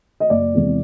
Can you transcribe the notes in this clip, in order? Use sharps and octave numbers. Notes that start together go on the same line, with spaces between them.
D#5
F#1 D5
E2 C3 E3 G#3